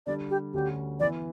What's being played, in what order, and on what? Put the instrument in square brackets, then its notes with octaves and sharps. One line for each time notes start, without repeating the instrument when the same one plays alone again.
[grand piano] D3 G3 D4 [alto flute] D5
[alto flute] G4
[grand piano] D2 D3 G3 C#4 F#4 [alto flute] G4
[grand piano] E3 B3 E4 [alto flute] D5